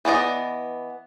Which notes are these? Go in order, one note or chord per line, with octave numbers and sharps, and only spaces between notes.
E3 B3 D5 D#5